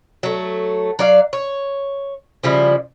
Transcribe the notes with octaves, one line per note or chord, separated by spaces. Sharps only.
F#3 A3
F#3 D5 F5
C#5
C#3 F3 G3 E4